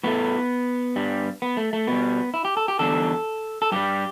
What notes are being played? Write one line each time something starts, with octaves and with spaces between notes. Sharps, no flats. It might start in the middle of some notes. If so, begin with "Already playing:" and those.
A2 A3 B3
G2 G3
B3
A3
A3
B2 G3 B3
E4
G4
A4
G4
E2 D3 G3 A4
A4
G2 G3 G4